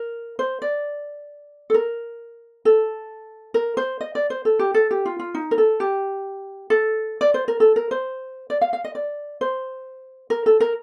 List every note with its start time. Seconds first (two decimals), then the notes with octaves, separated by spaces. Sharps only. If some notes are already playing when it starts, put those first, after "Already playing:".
Already playing: A#4
0.39 C5
0.62 D5
1.70 A4
1.74 A#4
2.65 A4
3.54 A#4
3.77 C5
4.01 D#5
4.15 D5
4.30 C5
4.45 A4
4.59 G4
4.74 A4
4.91 G4
5.06 F4
5.19 F4
5.34 D#4
5.51 A#4
5.58 A4
5.80 G4
6.70 A4
7.21 D5
7.34 C5
7.48 A#4
7.60 A4
7.76 A#4
7.91 C5
8.50 D5
8.61 F5
8.73 F5
8.84 D#5
8.95 D5
9.41 C5
10.30 A#4
10.46 A4
10.60 A#4